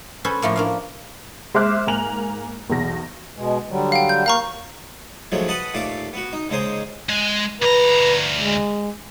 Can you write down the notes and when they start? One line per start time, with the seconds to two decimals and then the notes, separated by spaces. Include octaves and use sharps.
0.24 C#4 A4 B4 C5
0.42 A2 F3 A3 A#3
0.56 A#3 D4 F5
1.54 G#3 C5 E5 D6 F6 F#6
1.87 G#2 A#3 G#5 A#5 F7 F#7
2.70 B1 E2 A#6
3.37 B2 G#3
3.69 D3 F#3 G3
3.92 F5 G5
4.09 G6
4.26 A#3 A#4 F5 A#5 C#6
5.32 D#2 F3 F#3 G#3 A3
5.48 B4 D#5 F#5 A5 B5
5.74 D#2 A#2 A3 F5 A5 D6
6.13 B3 F#4
6.33 D#4
6.49 D#2 C#3 G#3 C5 A#5 D#6
7.09 G#3
7.62 D2 B4 A#5
8.40 G#3